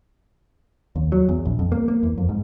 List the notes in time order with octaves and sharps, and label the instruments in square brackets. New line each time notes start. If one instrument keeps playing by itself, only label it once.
[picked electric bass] D#2
F#3
E2
A#1
F2
A#3
A#3
E2
F2
G#2